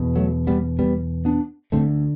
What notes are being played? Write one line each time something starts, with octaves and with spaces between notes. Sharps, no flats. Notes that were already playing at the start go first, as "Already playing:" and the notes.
Already playing: E2 B2
F#3 A3
G3 B3
G3 B3
B3 D4
D2 D3 A3 C4